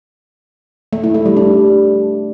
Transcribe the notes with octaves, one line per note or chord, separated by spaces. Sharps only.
A3
E4
A3
G3
D4